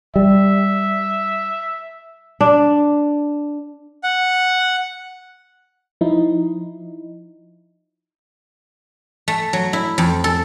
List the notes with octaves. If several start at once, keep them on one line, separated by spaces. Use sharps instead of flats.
G3 E5
D4
F#5
F3 D#4 E4
A3
F#3
E4
F2
A4